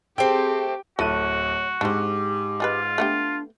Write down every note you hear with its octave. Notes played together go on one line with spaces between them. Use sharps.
A3 C4 G4 G#4 G5
D1 E4 F#4 A4 C#5 D#7
G#2 C4 D4 G4
G#3 F4 G#4 B4
A3 B3 D4 G4